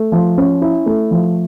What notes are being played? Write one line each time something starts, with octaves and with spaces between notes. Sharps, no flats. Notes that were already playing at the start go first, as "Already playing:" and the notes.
Already playing: A3
F3
C#4
E4
A3
F3